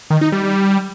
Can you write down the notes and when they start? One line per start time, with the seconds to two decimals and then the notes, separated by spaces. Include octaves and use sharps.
0.10 D#3
0.21 D#4
0.32 G3
0.43 G3